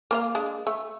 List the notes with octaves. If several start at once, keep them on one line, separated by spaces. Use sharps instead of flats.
A#3 C5 F5
G#3 D4
A3